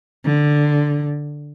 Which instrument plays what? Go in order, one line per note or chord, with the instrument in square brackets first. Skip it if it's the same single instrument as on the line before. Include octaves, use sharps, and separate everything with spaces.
[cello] D3